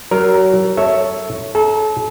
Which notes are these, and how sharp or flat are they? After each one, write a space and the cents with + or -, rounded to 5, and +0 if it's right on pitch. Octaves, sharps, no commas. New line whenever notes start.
F#3 +30 A#4 +0
A4 +10 C#5 +0 E5 -5
A4 -35 A#5 -10